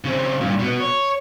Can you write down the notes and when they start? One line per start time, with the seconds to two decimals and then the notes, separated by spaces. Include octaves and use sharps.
0.04 C#3 C4
0.41 G2 A#2
0.59 B2 B3
0.80 C#5